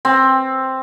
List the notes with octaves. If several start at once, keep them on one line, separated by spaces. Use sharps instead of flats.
C4